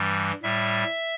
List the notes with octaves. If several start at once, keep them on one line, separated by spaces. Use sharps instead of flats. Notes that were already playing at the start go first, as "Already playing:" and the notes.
Already playing: G2 E3 G3
A2 G3 E5